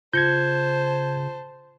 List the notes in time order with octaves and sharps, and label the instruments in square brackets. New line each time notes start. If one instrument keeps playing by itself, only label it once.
[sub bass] C#3 [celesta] F4 C#7 [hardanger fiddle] C5 A5 [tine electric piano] G6 G#6